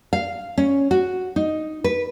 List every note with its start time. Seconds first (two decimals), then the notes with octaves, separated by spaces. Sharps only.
0.13 F5
0.58 C#4
0.91 F#4
1.36 D#4
1.84 B4